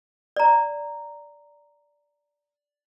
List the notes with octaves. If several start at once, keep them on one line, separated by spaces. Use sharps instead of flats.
D5 A#5